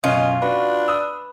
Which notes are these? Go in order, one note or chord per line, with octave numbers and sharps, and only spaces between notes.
F#2 B2 C#4 F4 D#5
D4 F#4 B4
D#6 E6